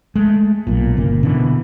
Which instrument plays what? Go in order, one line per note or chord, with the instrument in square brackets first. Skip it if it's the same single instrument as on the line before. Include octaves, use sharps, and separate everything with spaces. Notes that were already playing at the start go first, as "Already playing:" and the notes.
[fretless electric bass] G#3 A3
B1 A#2
G1 C#3 A#3
B2 D3 E3